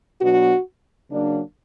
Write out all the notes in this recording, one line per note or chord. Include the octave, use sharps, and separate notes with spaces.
B2 F#3 B3 D4 F#4
C#3 F#3 A#3 D4